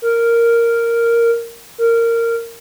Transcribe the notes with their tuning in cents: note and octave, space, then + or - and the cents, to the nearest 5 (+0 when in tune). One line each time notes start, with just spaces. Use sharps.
A#4 -5
A#4 -15